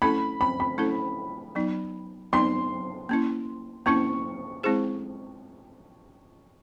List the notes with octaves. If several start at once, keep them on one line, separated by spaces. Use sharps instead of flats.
A3 C#4 E4 A4 B5
B5
B5
A3 C#4 E4 A4
F#3 B3 D#4
F#3 B3 D#4 C6
A#3 C#4 E4
A#3 C#4 E4 C#6
G#3 C4 E4 G#4 C5